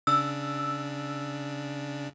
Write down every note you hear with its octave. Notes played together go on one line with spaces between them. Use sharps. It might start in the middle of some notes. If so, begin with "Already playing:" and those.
C#3 D4 E6